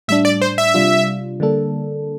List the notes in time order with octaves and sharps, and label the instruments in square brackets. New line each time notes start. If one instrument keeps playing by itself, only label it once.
[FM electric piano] A2 G3 D4 [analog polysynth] E5
[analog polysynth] D5
C5
E5
[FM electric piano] C3 G3 D4 F4
D3 G3 A#3 D4 A4